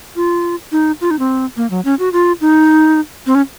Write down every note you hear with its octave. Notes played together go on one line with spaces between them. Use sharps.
F4
D#4
F4
D#4
C4
A#3
F#3
C#4
F#4
F4
D#4
C4
C#4